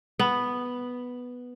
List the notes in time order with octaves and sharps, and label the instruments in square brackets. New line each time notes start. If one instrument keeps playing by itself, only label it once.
[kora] B3